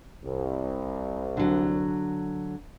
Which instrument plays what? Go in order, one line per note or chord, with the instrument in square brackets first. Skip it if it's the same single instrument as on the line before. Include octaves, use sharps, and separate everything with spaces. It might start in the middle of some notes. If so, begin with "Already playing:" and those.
[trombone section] C2
[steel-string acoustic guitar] D3 F#3